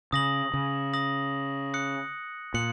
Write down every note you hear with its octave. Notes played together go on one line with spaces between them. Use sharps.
C#3 D#6 A#6 F#7
C#3
D#6 A#6 F#7
D#6 F#6 C#7 F#7
A#2 D#6 F#6 C#7 F#7